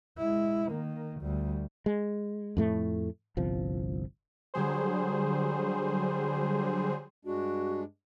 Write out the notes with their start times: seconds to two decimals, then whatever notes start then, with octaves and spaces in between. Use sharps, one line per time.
0.18 G#3 E4
0.71 D#3 A#3
1.21 D2 G3
1.86 G#3
2.57 F2 A2 A3
3.37 G1 C2 F3
4.54 D3 F#3 G3 G#4 C5
7.25 G2 G#3 D4 F#4